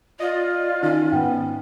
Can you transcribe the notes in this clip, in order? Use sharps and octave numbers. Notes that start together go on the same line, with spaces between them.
F4 D5 D#5
D#3 C#4 D#4
G#2 B3 G5